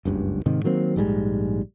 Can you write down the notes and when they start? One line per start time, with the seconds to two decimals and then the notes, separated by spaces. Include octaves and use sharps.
0.05 F#1 C#2 G2
0.46 G#2 C3 D#3
0.64 D#3 F#3 A#3 C4
0.96 A#1 G#2 G3 G#3